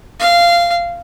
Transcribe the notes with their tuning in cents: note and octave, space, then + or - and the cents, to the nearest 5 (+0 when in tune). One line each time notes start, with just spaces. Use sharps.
F5 -15